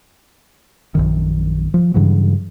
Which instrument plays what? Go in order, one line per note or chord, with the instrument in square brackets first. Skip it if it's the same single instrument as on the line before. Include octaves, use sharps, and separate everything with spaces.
[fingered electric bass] A#1 F#2 D#3
F3
G2 C#3 E3 F#3